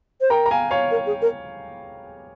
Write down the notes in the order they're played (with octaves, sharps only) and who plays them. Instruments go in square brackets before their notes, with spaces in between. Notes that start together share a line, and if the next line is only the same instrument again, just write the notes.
[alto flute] C5
[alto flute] A#4 [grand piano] G5 A#5
[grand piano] A#5
F5 G#5
C#5 F5
[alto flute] A#4
G#4
A#4